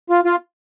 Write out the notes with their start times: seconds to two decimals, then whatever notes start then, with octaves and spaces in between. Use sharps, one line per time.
0.10 F4
0.25 F4